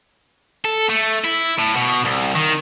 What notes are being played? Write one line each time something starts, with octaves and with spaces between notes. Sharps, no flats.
A4
A3
E4
A2
B2
C2
D#3